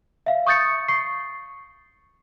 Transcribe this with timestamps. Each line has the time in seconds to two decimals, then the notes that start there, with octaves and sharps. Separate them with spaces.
0.26 E5 F5
0.47 C#6 D#6 G6 A6 C#7
0.88 C#6 C7